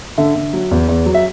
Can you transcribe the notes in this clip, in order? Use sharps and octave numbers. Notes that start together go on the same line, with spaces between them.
D3 E5
D3
F#3
E2
E2
F#3
E5